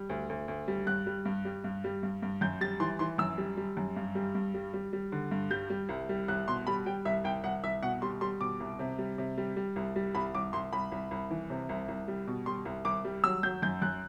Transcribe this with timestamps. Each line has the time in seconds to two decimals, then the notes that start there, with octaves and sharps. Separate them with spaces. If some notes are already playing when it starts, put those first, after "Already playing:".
Already playing: G3
0.09 D2
0.29 D2
0.48 D2
0.68 G3
0.87 G2 F#6
1.06 G3
1.25 G2
1.45 G3
1.64 G2
1.84 G3
2.03 G2
2.22 G2
2.41 F#2 G6
2.61 G3 A6
2.80 E3 C6
2.99 E3 C6
3.18 F#2 E6
3.38 G3
3.57 G3
3.77 F#2
3.96 G2
4.15 G3
4.35 G2
4.54 G3
4.73 G3
4.93 G3
5.12 D3
5.31 G2
5.50 G3 G6
5.70 G3
5.89 C2
6.09 G3
6.28 C2 F#6
6.47 B2 C6
6.67 G3 B5
6.86 G3 G5
7.05 C2 E5
7.24 C2 G5
7.44 C2 F#5
7.64 C2 E5
7.83 B2 F#5
8.02 G3 C6
8.21 G3 C6
8.40 B2 D6
8.60 C2
8.79 C3
8.98 G3
9.18 C3
9.37 G3
9.56 G3
9.76 C2
9.96 G3
10.15 C2 B5
10.35 C2 D6
10.53 C2 C6
10.73 C2 B5
10.92 C2
11.11 C2
11.31 E3
11.50 C3
11.69 C2
11.88 C2
12.08 G3
12.27 B2
12.46 G3 C6
12.65 C2
12.85 C2 D6
13.05 G3
13.24 F#3 E6
13.43 F#3 G6
13.62 F#2 G6
13.82 F#2 F#6